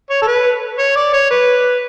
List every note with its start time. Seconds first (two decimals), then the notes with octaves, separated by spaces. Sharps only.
0.10 C#5
0.22 A4
0.28 B4
0.79 C#5
0.96 D5
1.13 C#5
1.31 B4